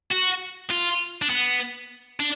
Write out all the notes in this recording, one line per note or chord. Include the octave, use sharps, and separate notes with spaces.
F#4
F4
D4
B3
D4